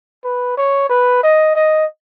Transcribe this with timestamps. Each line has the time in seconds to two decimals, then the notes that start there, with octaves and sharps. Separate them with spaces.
0.24 B4
0.57 C#5
0.90 B4
1.23 D#5
1.55 D#5